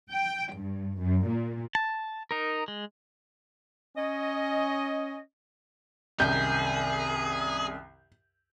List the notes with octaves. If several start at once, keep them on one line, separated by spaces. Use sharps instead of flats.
G5
G2
F#2
A#2
A5
D#4 A#4
G#3
C#4 D#5
C2 F#2 D#3 G#4 G6